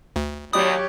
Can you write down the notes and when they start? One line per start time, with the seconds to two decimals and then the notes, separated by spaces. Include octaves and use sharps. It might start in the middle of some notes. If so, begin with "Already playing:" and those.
0.16 D2
0.53 D#2 F#3 G4 C#5 D5 B5 D#6